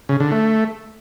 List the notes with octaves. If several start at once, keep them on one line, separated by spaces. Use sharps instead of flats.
C#3
D3
A3